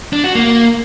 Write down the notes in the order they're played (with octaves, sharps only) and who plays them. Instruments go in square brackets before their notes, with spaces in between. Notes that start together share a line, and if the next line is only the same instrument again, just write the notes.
[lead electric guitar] D4
F#4
A#3